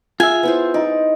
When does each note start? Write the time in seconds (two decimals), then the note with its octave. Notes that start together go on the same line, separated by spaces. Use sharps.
0.20 F4 G#4 E5 G#5
0.43 B3 E4 C5
0.74 D#4 D5